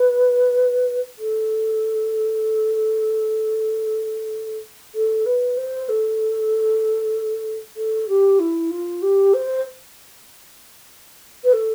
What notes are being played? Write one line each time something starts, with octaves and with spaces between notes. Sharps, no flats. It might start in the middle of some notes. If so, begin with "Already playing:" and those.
Already playing: B4
A4
A4
B4
C5
A4
A4
G4
E4
F4
G4
C5
B4
A4